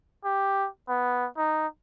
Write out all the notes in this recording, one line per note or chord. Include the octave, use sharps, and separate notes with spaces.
G4
B3
D#4